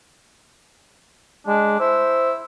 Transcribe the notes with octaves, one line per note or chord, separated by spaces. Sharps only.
G#3 D4
E4 C5